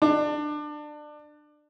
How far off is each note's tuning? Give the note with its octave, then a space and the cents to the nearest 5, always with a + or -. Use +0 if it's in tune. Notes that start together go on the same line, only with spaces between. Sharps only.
D4 +25